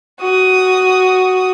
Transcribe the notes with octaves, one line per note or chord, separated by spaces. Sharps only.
F#4 D#6